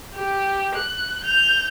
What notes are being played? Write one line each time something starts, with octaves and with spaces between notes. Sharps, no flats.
G4
F#6
G6 F7